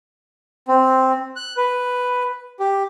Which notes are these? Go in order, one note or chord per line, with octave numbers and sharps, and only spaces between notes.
C4
F#6
B4
G4